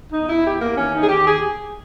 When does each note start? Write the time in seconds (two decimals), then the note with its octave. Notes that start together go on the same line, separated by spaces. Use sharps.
0.12 E2 D#4
0.29 E4
0.45 E3 G4
0.61 A#3
0.76 D#2 C#4
0.94 D#4
1.02 G#4
1.09 D#2 G4
1.25 G#4